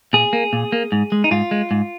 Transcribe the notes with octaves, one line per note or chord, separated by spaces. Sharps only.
A#2 G#4
A#3
A#2
A#3
G#2
G#3
D#4
G#2 F4
G#3
G#2